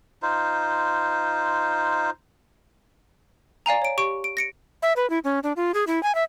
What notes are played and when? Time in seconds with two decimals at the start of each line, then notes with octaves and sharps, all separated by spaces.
0.23 D#4 F4 C5
3.66 D5 F5 G#5 A#5
3.82 C#5 D7
3.98 G4 C#6 D7
4.24 D7
4.37 A#6 C#7 D7
4.82 E5
4.96 B4
5.10 E4
5.24 C#4
5.43 D4
5.56 F4
5.74 G#4
5.87 E4
6.03 G#5
6.15 E5